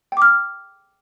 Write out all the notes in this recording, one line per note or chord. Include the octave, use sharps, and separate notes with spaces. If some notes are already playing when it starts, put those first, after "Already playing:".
G5 D6 F6